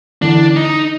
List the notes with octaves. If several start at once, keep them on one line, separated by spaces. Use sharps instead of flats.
D3 E3 D4
D#4